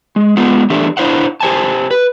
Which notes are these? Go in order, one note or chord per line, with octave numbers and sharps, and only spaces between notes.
G#3
G#3 B3 F4 F#5
E3 A3 D4 G4 E5
D4 E4 C5 F5 F#5
G4 C5 G#5 A5
B4